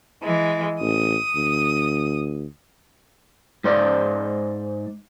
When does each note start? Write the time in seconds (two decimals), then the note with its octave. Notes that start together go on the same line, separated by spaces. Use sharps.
0.23 E3 G#3
0.81 A1 D#6
1.36 D2
3.64 G#2 C5 D5